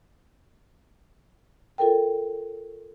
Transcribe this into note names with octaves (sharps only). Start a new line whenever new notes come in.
F4 A4 A#4 G5